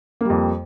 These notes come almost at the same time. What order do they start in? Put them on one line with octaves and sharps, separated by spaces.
A#3 G3 F2